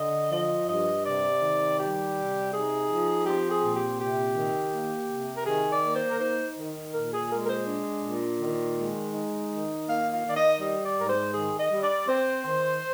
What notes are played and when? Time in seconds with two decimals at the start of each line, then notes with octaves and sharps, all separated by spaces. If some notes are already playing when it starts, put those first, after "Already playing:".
Already playing: D3 D#5
0.31 F3 D#5
0.68 G2 D#5
1.04 C3 D5
1.41 D#3
1.78 G3 G4
2.15 C3
2.52 D#4 G#4
2.88 F3
3.25 C4 G4
3.50 G#4
3.62 A#2
3.75 G4
3.99 C3 G4
4.35 D#3
4.72 A#3
5.09 C3
5.35 A#4
5.45 D#3 G#4
5.71 D5
5.83 A#3
5.95 C5
6.09 A#4
6.18 D#4 C5
6.55 D#3
6.92 A#2 A#4
7.11 G#4
7.29 G#3 A#4
7.42 A#4
7.47 C5
7.66 D4
8.03 A#2
8.39 D#3
8.76 G#3
9.13 D#4
9.49 D#3
9.87 A#3 F5
10.11 F5
10.24 D#3 D5
10.36 D#5
10.59 G3 D#5
10.84 D5
10.96 G#2 A#4
11.09 C5
11.33 D#3 G#4
11.57 D#5
11.70 G3
11.82 D5
12.07 C4 C5
12.43 D#3